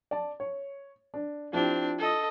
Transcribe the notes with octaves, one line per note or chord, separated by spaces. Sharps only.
D5 A5
C#5
D4
F3 C4 D4 E4 G4
A4 D#5